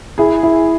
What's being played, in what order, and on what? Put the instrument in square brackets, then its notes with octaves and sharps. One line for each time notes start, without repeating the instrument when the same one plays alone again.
[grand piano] E4 [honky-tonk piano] G#4
[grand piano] E4